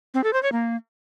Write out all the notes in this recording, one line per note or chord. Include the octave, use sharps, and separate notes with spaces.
C4
A4
C5
C#5
A#3